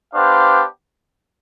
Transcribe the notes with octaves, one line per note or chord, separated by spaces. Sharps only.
B3 D4 G4 C5 F5